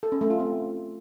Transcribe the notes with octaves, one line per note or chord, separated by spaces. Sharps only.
A4
C#4
A3
F4
C4